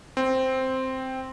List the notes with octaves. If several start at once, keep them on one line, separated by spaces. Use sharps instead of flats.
C4